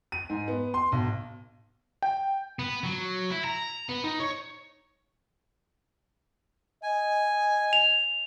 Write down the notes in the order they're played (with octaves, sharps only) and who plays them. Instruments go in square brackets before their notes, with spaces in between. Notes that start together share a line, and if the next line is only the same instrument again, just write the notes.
[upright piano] D#7
G#2
B3
C6
B1
[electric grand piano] G5
[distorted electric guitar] B3
F#3
E4
A#5
B3
D#4
C#5
[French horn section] D#5 [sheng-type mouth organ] G#5
[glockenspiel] F7